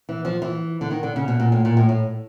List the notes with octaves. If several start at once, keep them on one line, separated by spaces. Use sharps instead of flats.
E3
F3
E3
D3
D#3
D3
C#3
B2
A#2
A2
A#2
A2
A2